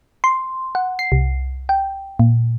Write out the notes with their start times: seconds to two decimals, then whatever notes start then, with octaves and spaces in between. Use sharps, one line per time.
0.24 C6
0.75 F#5
0.99 C7
1.12 C2
1.69 G5
2.19 A#2